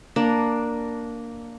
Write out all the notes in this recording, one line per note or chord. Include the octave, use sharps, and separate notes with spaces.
A#3 D4